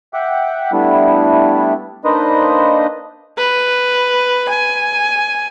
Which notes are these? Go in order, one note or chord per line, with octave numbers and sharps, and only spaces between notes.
E5 F#5 G5 D6
G3 A3 B3 D4 E4
A#3 D4 D#4 B4 C5 D#5
B4
G#5